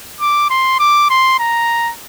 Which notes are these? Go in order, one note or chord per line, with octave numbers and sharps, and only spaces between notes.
D6
C6
D6
C6
A#5